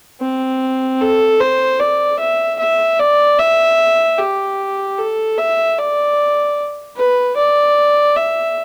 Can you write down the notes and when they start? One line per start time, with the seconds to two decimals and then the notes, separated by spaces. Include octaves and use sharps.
0.21 C4
1.01 A4
1.40 C5
1.80 D5
2.19 E5
2.59 E5
2.99 D5
3.39 E5
4.18 G4
4.98 A4
5.38 E5
5.78 D5
6.97 B4
7.37 D5
8.16 E5